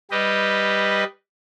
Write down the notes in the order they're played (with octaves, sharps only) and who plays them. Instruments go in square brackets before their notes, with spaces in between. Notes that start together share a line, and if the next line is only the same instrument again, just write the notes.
[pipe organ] G3 G4 B4 D#5